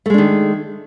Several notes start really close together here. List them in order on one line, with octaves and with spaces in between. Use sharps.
A3 G#3 D4 D#3